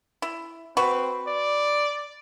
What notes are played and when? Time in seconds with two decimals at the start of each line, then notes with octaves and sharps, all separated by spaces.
0.22 E4
0.77 C4 F#4 B4
1.27 D5